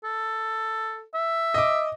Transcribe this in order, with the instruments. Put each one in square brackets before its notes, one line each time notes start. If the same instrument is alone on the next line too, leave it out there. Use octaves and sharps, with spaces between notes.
[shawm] A4
E5
[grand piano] D#5 D6